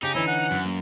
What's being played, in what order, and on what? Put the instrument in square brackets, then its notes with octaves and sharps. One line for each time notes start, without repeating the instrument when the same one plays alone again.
[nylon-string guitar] C#3 [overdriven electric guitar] D#4 [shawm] G4
[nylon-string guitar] D3 E3 C#4 [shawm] E4
[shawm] F#5
[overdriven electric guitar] F#2
[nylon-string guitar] A#3